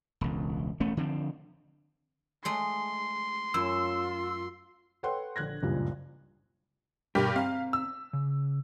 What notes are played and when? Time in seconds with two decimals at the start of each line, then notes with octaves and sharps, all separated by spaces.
0.21 E1 C#2
0.80 E1 A3 C#4
0.97 D3 F3 C4
2.45 G#3 A3 C6
3.54 F#2 F4 E6
5.03 A4 B4 C#5 F#5 G5 C6
5.36 A#1 D3 F#6 G#6 A#6
5.63 F#1 C#2 G2 A#2 F3
7.15 G2 B2 G4 A4 A#4 B6
7.36 C4 F5 A#5
7.73 E6
8.13 C#3